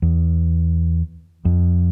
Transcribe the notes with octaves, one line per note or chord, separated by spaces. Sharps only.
E2
F2